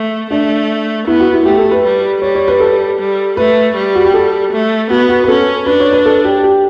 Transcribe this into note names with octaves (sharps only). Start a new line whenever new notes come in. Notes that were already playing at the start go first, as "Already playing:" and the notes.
Already playing: A3
A3 D4
B3 E4
F#4
E4
A3 G4
A4
B4
G3
G3 C#5
C#5
B4
A4
G3
A3 B4
G3
F#4
G4
A4
A3
B3 F#4
F#4
B4
C#4 A4
D4 B4
C#5
B4
A4
G4
G4